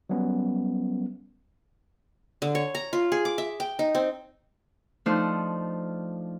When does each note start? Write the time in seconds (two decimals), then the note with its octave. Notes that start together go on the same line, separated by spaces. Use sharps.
0.09 F#3 G3 B3 C#4
2.42 D3
2.55 C#5
2.75 A#5
2.93 F4
3.12 G#4
3.25 D6
3.38 E5
3.60 G5
3.79 D#4
3.95 C4
5.06 F3 A3 D4 D#4 F4 C5